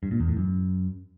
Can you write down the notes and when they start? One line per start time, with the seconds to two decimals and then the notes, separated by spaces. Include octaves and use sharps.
0.03 G2
0.11 A#2
0.20 E2
0.28 A2
0.37 F#2